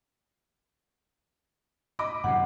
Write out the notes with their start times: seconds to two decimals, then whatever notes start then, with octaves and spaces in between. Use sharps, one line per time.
1.99 D#5 B5 D6
2.24 F#2 C3 F#5